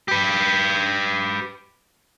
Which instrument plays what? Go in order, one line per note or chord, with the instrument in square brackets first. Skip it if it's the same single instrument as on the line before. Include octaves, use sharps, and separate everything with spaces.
[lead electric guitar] G4 B4